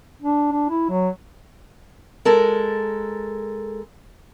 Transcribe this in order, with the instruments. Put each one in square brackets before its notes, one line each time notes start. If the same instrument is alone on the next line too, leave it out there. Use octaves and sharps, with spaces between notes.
[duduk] D4
D4
E4
F#3
[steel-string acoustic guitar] G#3 A4 A#4